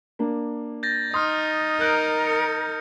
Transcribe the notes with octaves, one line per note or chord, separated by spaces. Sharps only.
A#3 D4
G6 A6 A#6
D#4 C6 D#6 F6
A#4 F#6 G6
C#7